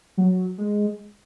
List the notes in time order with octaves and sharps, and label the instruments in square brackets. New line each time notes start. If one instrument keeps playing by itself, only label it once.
[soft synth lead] F#3
G#3